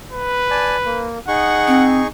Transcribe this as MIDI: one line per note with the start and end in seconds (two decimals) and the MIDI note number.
0.12 1.09 71
0.50 0.76 74
0.50 0.76 80
0.50 0.76 81
0.86 1.18 58
1.28 2.07 63
1.28 2.07 68
1.28 1.85 78
1.28 2.07 85
1.67 2.01 60